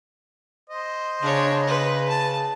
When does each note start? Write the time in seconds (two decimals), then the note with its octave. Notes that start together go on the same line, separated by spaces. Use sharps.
0.70 C5 D#5
1.22 C#3 D4 C#5
1.67 B4
2.08 A5